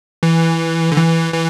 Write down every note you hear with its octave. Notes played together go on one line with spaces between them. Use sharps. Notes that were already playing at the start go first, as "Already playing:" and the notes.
E3
D3
E3
E3